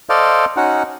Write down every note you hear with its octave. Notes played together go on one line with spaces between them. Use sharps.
A4 C5 D5 D#5 F5
C#4 D#4 F#4 F#5